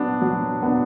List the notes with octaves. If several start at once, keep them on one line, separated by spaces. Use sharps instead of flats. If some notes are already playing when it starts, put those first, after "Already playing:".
Already playing: F#3 B3 D4
F#3
B3 D4